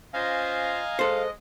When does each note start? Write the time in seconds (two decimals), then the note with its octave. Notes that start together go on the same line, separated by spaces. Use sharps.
0.13 C#4 F4 C5 D#5 F5 G#5 A#5
0.99 G#3 A4 C5 D#5